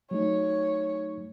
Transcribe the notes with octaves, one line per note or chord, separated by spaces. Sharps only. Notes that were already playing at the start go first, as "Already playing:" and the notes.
F#3 A3 D#4 C#5